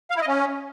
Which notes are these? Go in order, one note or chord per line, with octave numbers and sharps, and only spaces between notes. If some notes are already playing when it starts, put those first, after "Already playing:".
F5
E4
D#5
C#4